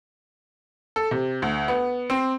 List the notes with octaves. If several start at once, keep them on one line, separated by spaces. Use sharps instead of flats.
A4
C3
D2
B3
C4